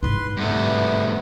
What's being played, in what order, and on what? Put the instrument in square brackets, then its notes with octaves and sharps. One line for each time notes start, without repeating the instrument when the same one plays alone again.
[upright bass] G#2 E4 [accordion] B4 C6
[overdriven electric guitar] G2 A3 [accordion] C3 B3